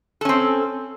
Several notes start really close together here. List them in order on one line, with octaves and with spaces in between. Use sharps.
A4 C#4 C4